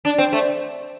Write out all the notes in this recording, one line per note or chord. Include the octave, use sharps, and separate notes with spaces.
D4
C4
A3